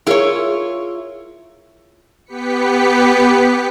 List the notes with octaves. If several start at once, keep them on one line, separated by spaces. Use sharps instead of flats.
E4 F4 G#4 A#4 C#5
B3 G4 B4 B6 C#7